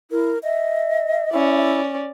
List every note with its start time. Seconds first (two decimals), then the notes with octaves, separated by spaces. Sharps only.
0.11 E4 A#4
0.43 D#5 E5
1.32 C#4 E4 D5